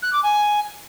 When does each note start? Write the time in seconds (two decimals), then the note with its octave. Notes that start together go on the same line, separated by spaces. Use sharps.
0.02 F#6
0.13 D6
0.23 G#5